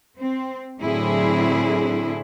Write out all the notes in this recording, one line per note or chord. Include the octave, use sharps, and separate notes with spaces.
C4
A2 D3 F#3 C4 E4 G#4